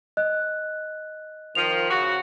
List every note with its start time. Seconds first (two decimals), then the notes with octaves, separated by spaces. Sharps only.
0.17 D#5 F#6
1.55 D#3 F3 D#7 F7
1.91 C#3 F#4